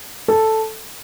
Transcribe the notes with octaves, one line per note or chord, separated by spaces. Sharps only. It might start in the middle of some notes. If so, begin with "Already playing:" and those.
A4